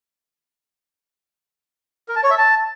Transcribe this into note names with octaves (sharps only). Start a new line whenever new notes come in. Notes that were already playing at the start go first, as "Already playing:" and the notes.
A#4
A5
C#5
E5
A5